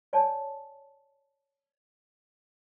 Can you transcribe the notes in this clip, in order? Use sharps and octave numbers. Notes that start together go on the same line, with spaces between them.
C#5 D5 G#5 A5